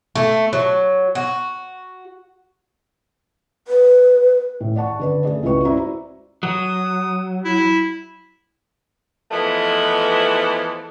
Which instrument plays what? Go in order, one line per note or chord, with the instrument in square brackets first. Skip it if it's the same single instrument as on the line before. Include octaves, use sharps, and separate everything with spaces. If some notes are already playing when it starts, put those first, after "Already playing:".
[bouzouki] A3
F#3
F#4
[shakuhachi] B4
[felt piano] A2
D5 F#5 A5 C#6
D3 B4 D5
A3 G#4 D5
C#2 G#3 E4 F#4 B4 C#6
E4 F#4 C5 D5 E5 A#5
[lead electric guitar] F#3 [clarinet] D#6
[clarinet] E4
[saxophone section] E3 F3 G#3 A3 B3